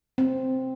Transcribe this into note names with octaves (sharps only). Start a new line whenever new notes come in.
C4